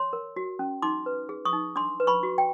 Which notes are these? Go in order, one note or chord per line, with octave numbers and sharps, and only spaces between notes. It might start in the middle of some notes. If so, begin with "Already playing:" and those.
Already playing: C#5 C6
A#4
F#4
C#4
D#4 C6 D6
B4
G#4
C#6 D#6
D#4
D4 C6 D6
B4
B5 C#6
F#4
G5